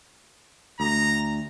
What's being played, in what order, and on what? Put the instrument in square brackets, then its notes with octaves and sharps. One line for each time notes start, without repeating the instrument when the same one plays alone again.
[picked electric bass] D2 [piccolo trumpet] A#5